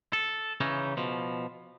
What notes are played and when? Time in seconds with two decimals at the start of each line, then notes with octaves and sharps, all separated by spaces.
0.13 A4
0.60 C#3 E3 C#4 D#4
0.97 B2 F3